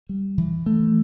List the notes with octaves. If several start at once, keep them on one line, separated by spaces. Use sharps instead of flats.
G3
E3
A3